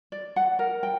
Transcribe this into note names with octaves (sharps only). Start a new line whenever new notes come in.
D5
F#5
A#4
G5